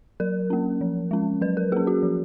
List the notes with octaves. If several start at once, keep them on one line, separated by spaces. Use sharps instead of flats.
F#3 A#4
A#3 C#4
F3
G#3 C#4
F#3 B4
A#4
A#3 C#4 G#4
F#4
F3